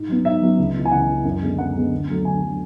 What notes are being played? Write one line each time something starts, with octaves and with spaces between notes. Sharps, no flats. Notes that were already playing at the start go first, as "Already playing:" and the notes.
Already playing: G#2
F#3 B3
G#2 E5
F#3 B3
C#2
C#3 E3
G#5
C#2 F#5
C#3 E3
F#2
D3 G#3 B3
F#2 F#5
D3 G#3 B3
D2
D3 F#3 A3
D2 G#5
D3 F#3 A3